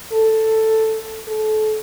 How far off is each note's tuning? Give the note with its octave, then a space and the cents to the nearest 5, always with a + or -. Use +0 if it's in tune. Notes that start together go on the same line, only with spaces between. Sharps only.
A4 +5
A4 -30